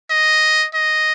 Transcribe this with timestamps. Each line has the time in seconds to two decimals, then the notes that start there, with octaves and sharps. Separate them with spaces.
0.10 D#5
0.74 D#5